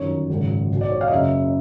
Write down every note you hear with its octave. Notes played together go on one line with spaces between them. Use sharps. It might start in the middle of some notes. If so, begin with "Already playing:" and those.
Already playing: G1 F#2 D#3 C#5
G#1 F#2 C#3
B1 B2
D5
C#5
F5
D#5
F#1 F#2 C#3 E5